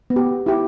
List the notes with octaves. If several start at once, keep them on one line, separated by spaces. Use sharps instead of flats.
B3
G4
E4 G4